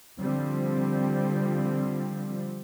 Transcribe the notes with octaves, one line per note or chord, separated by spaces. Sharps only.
D3 F3 G3 C4